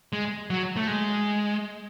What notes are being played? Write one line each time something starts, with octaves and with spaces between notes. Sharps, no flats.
G#3
F#3
A3
G#3